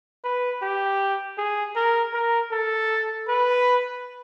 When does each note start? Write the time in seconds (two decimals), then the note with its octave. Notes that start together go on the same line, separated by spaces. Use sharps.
0.24 B4
0.62 G4
1.38 G#4
1.76 A#4
2.14 A#4
2.51 A4
3.28 B4